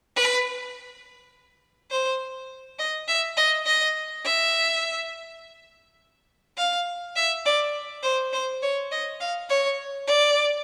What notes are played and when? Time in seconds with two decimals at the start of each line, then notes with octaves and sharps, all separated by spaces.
0.16 B4
1.91 C5
2.79 D#5
3.08 E5
3.37 D#5
3.66 D#5
4.25 E5
6.57 F5
7.16 E5
7.45 D5
8.03 C5
8.33 C5
8.62 C#5
8.91 D#5
9.20 F5
9.49 C#5
10.08 D5